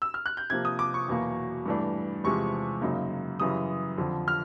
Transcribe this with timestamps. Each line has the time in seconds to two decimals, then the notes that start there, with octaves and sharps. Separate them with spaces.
0.02 E6
0.14 F6
0.26 F#6
0.37 G6
0.50 C3 F3 A#3 G#6
0.65 D#6
0.79 D6
0.94 C#6
1.08 E2 B2 F#3 A#3
1.66 G2 E3 A3 D4
2.24 E2 C3 F3 G#3 C#6
2.82 F#2 C#3 F#3 A#3 D#4
3.40 F#2 C#3 E3 G3 D#6
3.98 F2 D3 F3
4.28 F6